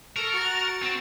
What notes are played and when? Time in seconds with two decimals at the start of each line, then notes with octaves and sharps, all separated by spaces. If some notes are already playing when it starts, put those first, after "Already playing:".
0.16 A4 A#4 C#6
0.32 F#4 A6 C#7
0.83 C4